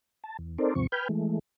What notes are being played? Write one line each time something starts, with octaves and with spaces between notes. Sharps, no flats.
A5
E2
C4 D#4 A4 A#4 C5 D5
D#2 G#2 C3 F3 C4 C#6
B4 G5 G#5 B5 F6 G6
E3 G#3 A3